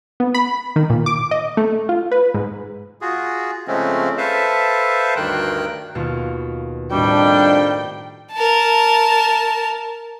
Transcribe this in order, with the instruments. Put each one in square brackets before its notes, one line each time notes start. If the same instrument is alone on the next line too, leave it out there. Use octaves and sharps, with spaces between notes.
[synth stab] B3
B5
D#3
A#2
D6
D#5
A3
F4
B4
G#2
[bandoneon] F4 F#4 G#4
C#3 F3 G#3 A3 C4 C#4
A4 B4 C5 E5 F5 A5
D2 G2 D#3 A#4 G5 F#6
[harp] D#2 B2 F4
[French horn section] F2 D#3 D4 [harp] A2 F#4 [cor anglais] G3 [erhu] G5
[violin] A#4 A5